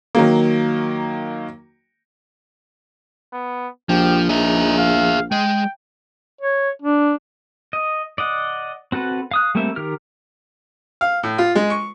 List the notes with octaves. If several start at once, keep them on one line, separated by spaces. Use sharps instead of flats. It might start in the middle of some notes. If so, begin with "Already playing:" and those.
D#3 F#3 A#3
B3
A#1 F3 G4
D#4 G#4 E5
F5
G#3 G5
C#5
D4
D#5
D5 D#5 F#5
C4 F#4 A4 B4
F5 D#6 F#6
G3 A3 A#3 C4 E5
D#3 G4 A#4 F6
F5
A2
F4
G#3
C#6